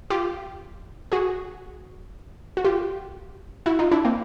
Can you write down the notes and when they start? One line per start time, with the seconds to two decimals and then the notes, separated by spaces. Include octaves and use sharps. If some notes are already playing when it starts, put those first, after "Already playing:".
0.10 F4 G4
1.12 F#4 G#4
2.57 F#4
2.64 F4 G4
3.66 E4 F#4
3.79 D#4 F4
3.92 D4 E4
4.05 A#3 C4